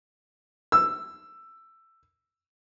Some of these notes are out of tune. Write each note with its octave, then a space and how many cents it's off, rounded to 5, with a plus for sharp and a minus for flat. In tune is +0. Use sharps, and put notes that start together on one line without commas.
E6 +10